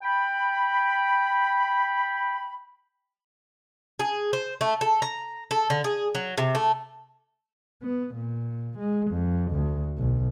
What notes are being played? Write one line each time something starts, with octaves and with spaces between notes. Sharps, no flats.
G5 B5
G#4
C5
A3
A4
A#5
A4
D3
G#4
F#3
C3
A3
B3
A#2
G#3
F2
D2
B1